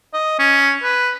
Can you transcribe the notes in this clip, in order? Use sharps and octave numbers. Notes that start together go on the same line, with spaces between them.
D#5
C#4
B4